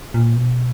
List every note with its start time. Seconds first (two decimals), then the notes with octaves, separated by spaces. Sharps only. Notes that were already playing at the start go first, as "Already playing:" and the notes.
0.14 A#2
0.36 B2